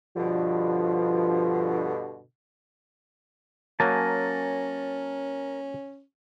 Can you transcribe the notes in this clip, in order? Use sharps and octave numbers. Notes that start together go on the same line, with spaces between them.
G2 B2 D3 F3
F#3 A#3 C#4 A#4 G#5 A5